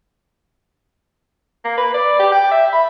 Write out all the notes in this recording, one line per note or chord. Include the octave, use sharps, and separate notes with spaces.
A#3
B4
D5
G4
G5
E5
B5